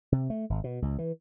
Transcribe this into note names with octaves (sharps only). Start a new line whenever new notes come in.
C3
A3
G#1
B2
C#2
E3